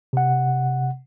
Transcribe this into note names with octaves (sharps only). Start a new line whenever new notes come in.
C3 F#5